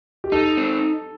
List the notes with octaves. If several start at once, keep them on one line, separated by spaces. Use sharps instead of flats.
G4
D#4 A4
C4